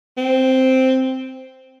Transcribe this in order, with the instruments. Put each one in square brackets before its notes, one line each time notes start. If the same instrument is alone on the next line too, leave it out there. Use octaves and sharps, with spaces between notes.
[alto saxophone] C4